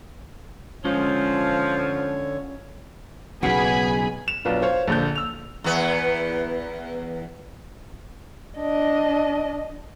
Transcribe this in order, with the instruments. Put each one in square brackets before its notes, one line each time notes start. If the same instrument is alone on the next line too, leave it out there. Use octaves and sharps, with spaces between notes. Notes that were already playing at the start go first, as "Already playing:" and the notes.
[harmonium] D3 C#5 [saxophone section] F3 [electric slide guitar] G#3 C#4 F4
[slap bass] B1 C#3 [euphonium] B3 [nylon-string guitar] F#4 [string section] G#4 G#5 B5
[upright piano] E7
B1 B3 D4 F4
C5 C#5 F5
A#1 D3 G6
E6 F7
[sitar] E2 B3
[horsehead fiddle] D4 D#5